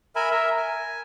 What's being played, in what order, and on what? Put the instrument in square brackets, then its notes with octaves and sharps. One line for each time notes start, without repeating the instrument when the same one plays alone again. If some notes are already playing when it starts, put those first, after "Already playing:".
[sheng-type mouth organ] A#4 E5 G#5 B5
A#4 E5
G#5